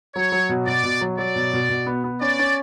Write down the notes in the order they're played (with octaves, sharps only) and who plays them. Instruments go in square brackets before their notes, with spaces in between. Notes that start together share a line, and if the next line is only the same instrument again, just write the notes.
[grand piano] F#3 [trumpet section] C#5
[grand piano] F#3
B2
[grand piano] B2 [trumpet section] D5
[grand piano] B2
F#3
[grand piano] F#3 [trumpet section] D5
[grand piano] B2
B2
B2
B3
B3
[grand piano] C#4 [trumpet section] D5
[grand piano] C#4